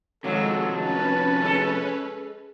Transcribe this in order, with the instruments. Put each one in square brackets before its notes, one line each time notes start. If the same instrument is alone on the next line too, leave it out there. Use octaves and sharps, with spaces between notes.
[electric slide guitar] C3 F3 F#4 [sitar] D#3 F#3 [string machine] G#3 [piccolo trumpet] A4
[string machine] C#4 B4 [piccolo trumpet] A5
[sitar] G#3 A4